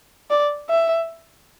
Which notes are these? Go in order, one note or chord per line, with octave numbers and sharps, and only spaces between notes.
D5
E5